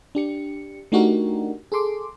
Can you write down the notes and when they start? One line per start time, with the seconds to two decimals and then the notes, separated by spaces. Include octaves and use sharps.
0.15 D4 G4 C#7
0.92 A3 D4 D#4 F#4 G4 A#4
1.72 G#4 A4 C6 D6